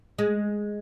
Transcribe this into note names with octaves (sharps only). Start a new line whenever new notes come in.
G#3